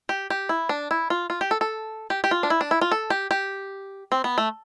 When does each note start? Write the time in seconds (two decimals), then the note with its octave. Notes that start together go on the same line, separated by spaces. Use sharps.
0.09 G4
0.30 G4
0.49 E4
0.69 D4
0.91 E4
1.10 F4
1.30 F4
1.41 G4
1.51 A4
1.61 A4
2.10 G4
2.24 G4
2.31 F4
2.43 D4
2.50 E4
2.61 D4
2.71 E4
2.81 F4
2.91 A4
3.10 G4
3.31 G4
4.12 C4
4.24 B3
4.38 A3